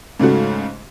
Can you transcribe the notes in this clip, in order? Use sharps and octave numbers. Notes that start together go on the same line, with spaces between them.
G#2 C#3 A3 F#4